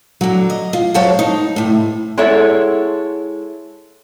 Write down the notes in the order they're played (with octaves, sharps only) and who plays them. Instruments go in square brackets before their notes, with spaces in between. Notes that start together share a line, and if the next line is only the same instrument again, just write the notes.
[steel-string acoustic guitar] D3 F#3
D#5
F4
F#3 C5 C#5 F5 F#5 A5
D#4
A2 C3
[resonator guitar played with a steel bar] G#3 E4 A4 C#5 E5 F#5